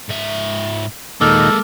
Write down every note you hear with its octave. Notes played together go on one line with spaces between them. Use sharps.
G#2 E5
D#2 A#2 D#3 G#3 A#3 A4 D6 F6